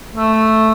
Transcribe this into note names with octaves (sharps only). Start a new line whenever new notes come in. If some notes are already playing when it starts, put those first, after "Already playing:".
A3